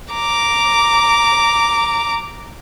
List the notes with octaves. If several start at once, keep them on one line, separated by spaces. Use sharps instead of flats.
A#5 D6